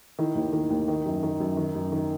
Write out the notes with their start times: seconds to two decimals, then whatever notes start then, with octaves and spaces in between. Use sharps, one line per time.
0.19 D#3 E4
0.35 D#2
0.53 D#3
0.70 D#2
0.88 D#3
1.06 F#2
1.23 D#3
1.40 F#2
1.57 D#3
1.75 F#2
1.92 D#3